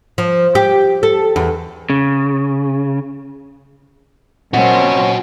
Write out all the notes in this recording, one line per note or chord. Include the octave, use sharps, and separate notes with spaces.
F3
G4
A4
E2
C#3
A#2 F#3 C4 C#4 F#4 D#5 F#5